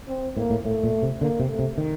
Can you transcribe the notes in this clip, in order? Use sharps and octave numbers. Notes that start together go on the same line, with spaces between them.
C4
A2 A#3
A2
A2 A3
A#2
C3
D3 A#3
C3
A3
C3
D#3